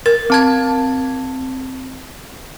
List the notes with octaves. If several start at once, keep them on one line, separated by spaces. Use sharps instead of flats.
A#4 A6
C4 A5 G#6